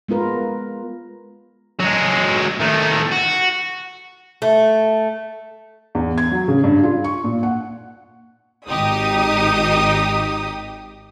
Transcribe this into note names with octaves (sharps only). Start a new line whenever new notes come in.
G#3 B3 F4 A#4 B4
F#3 G#3
D#3 A3
F#4
A3
E2
G#6
F#3
C#3
G2
F4
C#6
A#2
F#5
G#1 D#4 G4 D#6